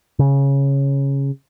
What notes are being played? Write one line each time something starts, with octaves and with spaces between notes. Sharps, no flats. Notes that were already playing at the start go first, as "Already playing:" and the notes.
C#3